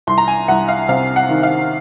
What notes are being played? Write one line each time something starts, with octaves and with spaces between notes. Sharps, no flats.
C2 C6
A#5
G#5
C2 F#5
F5
C3 F5
F#5
D#3
F5